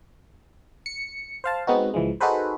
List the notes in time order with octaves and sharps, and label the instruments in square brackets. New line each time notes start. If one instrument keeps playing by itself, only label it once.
[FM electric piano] C#7
C5 F5 A5
G#3 B3 C4 D#4 F#4
C#2 E3 F3 G#3
D#4 F#4 G#4 A4 B4 C5